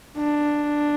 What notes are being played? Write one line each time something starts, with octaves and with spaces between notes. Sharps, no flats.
D4